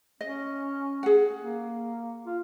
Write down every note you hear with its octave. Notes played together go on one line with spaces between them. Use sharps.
C#4 D#5
G#4 F#5
A#3
F4